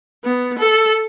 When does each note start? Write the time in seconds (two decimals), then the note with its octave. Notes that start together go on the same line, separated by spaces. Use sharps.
0.24 B3
0.58 A4